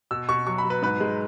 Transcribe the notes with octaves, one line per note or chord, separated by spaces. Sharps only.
B2 E6
B2 C#6
F#3 C#6
B5
F#3
B4
G#2 B4
G#3